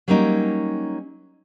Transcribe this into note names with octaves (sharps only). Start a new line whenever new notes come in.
F#3 G3 A#3 C#4 D#4